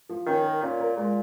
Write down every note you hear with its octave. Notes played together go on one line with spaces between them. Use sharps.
F3
D#3 C#4
A#4
A#2 C#4
A#4
A#2 G#3